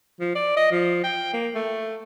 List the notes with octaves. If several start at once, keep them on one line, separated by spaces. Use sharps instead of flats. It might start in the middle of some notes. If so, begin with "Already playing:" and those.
F3
D5
D#5
F3
G5
A#3
A3